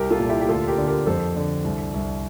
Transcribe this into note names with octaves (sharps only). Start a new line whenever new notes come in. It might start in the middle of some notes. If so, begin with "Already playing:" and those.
Already playing: C2 G4 A#4
F4 A4
A#2
E4 G4
G4
D2 F4 A4
G4 A#4
D3
G4 A#4
F2 A4 C5
D3
C2
C2